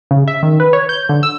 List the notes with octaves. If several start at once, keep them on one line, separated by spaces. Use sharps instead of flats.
C#3
E5
D#3
B4
C#5
G6
D3
E6